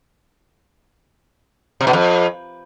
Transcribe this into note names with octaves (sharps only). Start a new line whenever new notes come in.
C3
B2
F2